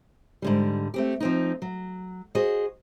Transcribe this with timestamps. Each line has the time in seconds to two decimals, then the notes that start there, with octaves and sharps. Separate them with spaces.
0.42 G#2 D3 G3
0.94 A3 C4 G4
1.20 F3 C4 D#4
1.62 F#3
2.35 F#4 G#4 C5 D#5